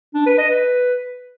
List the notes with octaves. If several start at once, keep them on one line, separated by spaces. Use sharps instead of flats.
D4
B4
D#5
B4